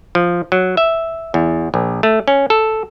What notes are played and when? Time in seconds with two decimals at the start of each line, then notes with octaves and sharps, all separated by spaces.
0.15 F3
0.52 F#3
0.77 E5
1.34 E2
1.74 A#1
2.03 A3
2.28 C#4
2.50 A4